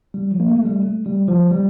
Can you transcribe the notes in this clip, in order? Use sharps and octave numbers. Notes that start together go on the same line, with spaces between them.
G3
F3
A#3
A3
A3
G3
A3
G3
F3
G3